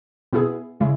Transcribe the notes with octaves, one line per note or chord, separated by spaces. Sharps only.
B2 B3 E4 G#4
C#3 G#3 E4